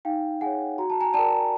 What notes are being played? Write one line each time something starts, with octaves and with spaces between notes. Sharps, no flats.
D#4 F5 G5
G#4 C#5 F#5 G#5
F#4 A#5
A5
G#5 A#5
A#4 D5 G5 A5